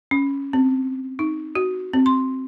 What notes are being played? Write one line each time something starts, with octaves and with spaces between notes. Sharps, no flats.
C#4
C4
D#4
F#4
C4
C6